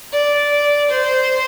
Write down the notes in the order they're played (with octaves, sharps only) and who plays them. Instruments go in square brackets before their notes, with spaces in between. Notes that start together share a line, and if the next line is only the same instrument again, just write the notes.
[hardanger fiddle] D5
C5